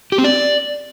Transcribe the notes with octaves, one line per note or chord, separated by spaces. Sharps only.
G4
C4
D5